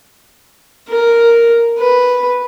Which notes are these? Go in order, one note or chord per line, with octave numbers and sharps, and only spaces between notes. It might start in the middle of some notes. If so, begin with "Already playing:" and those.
A#4
B4